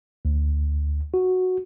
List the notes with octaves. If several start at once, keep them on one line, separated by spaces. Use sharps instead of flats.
D2
F#4